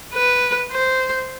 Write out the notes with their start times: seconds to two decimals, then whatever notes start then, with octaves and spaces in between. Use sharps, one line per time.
0.14 B4
0.72 C5